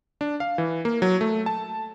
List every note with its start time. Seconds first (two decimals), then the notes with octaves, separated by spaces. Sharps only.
0.21 D4
0.40 F5
0.58 E3
0.85 A#3
1.02 F#3
1.21 A3
1.46 A5